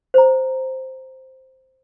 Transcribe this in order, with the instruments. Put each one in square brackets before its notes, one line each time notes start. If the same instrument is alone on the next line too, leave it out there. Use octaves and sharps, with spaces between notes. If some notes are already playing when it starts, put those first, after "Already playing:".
[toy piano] C5 A#5